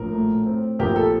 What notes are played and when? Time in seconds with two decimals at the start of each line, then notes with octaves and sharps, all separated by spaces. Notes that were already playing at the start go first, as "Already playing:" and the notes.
Already playing: A#1 A2 A#4
0.13 A3
0.46 C4
0.79 A#1 G4 A#4
0.96 A4